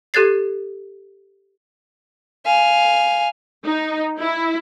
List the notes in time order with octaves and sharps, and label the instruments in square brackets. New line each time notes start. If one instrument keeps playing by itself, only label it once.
[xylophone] G4 A4 F#6 G#6 A6 C7
[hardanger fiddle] F5 G#5
[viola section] D#4
E4